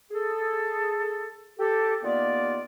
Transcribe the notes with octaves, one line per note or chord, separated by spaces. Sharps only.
G#4 A4
G4 A4
D#2 A#3 B3 F4 D5